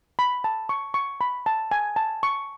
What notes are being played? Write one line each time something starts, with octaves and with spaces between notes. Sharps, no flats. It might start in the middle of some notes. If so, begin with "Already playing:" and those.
B5
A5
C#6
C#6
B5
A5
G#5
A5
C#6